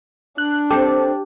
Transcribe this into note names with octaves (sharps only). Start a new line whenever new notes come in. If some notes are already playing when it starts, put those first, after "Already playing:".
D4 F#6
C4 G4 A4